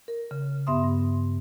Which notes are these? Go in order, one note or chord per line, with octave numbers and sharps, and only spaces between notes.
A#4
C#3
G2 B3 E5 C6 D#6
G2